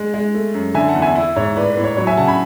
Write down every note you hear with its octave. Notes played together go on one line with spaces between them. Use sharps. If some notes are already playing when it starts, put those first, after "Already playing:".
Already playing: G#3
G#3
A3
F#2
D3 E5 G#5
F#5 A5
E2
E5 G#5
E4
G#2 C#5
A2 B4 D5
B4
A2
C#5
F#3 C#5
E5 G#5
C#3 F#5 A5
G#5 B5